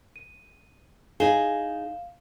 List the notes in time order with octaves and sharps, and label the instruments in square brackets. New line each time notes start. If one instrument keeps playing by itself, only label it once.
[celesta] D#7
[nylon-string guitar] D#4 G#4 [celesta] F5 E7 G7